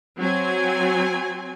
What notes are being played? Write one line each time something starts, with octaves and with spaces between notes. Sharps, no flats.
F#3 C4 G#5